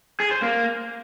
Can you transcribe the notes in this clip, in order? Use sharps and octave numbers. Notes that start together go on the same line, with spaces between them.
G#4
C5
A#3